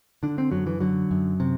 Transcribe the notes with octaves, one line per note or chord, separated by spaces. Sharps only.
D3 D4
C4
F#2 F#3
E3
D3 F#3
F#2
C3